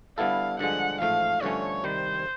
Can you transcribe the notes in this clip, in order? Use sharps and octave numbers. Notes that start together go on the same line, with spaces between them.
D3 G3 B3 E4 A4 F5
G2 D3 F3 G#3 F#5
A1 G#2 F3 A3 F5
G2 D3 F3 A3 C#4 C#5
C3 D#3 G3 C5